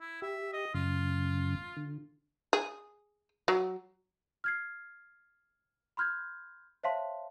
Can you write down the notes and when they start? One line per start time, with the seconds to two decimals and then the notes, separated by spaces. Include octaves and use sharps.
0.01 E4
0.22 G4 E5
0.53 D#5
0.74 F#2 C#3 F4
1.77 D3
2.53 G#4
3.48 F#3
4.44 F6 G#6 C7
5.97 B5 C6 F6 G6 G#6
6.83 C5 C#5 E5 F5 A5 C6